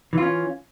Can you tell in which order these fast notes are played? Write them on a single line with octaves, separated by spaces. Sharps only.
E3 F4 C#4